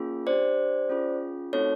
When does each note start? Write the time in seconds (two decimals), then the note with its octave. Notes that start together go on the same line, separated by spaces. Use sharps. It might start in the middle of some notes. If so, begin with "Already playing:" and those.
Already playing: A#3 C#4 F4 G#4
0.26 D4 G4 C5 D5
0.90 C#4 F4 G#4
1.53 A3 C4 D#4 F#4 A4 C#5